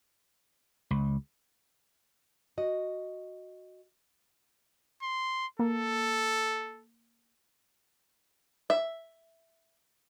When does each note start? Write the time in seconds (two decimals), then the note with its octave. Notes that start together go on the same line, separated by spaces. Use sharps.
0.91 C#2
2.58 F#4 D#5
5.02 C6
5.59 A#3 A4
8.70 E5